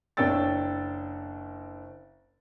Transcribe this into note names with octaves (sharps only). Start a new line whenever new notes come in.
F#1 D4 C#5 G5 E6 A6